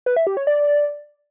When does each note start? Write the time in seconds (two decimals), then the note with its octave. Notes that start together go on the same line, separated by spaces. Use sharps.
0.06 B4
0.16 E5
0.27 G4
0.37 C#5
0.47 D5